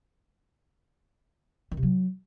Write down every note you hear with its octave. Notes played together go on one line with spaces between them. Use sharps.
D#3
C3
F#3